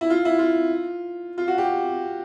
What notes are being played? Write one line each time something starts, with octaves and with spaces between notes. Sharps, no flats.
E4
F4
E4
F4
F4
F#4
G4